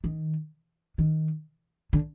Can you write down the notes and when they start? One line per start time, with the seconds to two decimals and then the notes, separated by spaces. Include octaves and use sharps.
0.04 D#3
0.98 D#3
1.93 D3